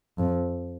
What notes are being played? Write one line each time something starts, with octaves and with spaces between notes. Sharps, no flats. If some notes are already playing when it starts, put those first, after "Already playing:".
F2